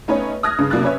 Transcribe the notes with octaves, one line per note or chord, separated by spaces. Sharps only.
A3 B3 C#4 D#4 B4 C#5
D#6 F6 F#6 G#6 A#6
G2 C#3
C3 F#3 A#3 D4 F#6 A6
C#4 B4 C#5 E5